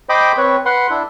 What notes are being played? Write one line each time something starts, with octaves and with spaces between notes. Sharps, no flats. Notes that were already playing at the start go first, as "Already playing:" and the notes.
C5 D#5 G5 B5 D6
C4 B4 C#5
B4 F#5 C6
D4 E4